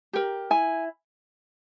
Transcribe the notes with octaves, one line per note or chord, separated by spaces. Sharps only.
G4 A#4
E4 G#5